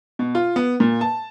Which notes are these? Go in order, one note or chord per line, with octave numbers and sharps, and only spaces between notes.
B2
F4
B3
A#2
A5